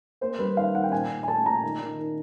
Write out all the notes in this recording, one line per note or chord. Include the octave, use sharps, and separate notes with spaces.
A#3 C5
G3 B4
D#3 F5
D#3 F#5
G5
A#2 G#5
A#2
G#5
A3 A5
A#2 A#5
D#3
D#3
D#3